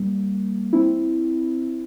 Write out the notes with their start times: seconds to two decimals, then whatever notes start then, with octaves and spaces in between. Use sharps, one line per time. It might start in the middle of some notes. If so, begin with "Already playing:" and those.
Already playing: G3 A#3
0.73 C4 E4